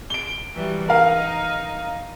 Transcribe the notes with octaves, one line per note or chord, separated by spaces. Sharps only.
D7 G7
E3 F#3 G3
D#4 A#4 F5